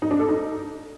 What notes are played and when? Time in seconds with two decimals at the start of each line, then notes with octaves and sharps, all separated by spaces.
0.02 D#4
0.11 D4
0.20 A4
0.28 D#4